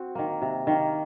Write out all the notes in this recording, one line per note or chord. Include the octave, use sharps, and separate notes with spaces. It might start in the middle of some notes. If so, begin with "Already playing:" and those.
Already playing: C4 F#4
D#3 A#3
C3
D#3 A#3